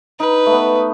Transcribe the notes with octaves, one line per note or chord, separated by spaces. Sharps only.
D#4 B4
A3
B3